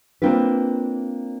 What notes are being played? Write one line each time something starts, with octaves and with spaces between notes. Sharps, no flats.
A#3 C4 D4 F4 B4